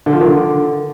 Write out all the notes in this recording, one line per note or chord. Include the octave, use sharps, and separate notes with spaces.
D3
F3
D#3
D3